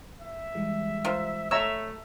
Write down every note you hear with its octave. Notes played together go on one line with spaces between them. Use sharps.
E5
E3 G3 G#3
F4 A#4 C5
A3 C#5 E5 A#5 E6